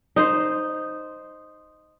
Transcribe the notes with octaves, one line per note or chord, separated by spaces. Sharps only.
D#4 C5